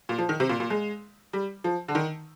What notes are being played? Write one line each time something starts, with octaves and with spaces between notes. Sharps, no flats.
A#2
F3
D#3
C3
A#2
A#2
G#3
G3
F3
D3
D#3